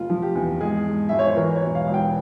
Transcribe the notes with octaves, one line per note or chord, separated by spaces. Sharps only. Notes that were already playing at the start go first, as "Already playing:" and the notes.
Already playing: F1 F4
F3
G4
E2
G#2 G#4
G#2
G#1 E5
C#5
C5
E3 A#4
C#5
E1
F5
E1
G5